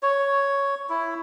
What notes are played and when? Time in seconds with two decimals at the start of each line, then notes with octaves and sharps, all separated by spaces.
0.03 C#5
0.89 E4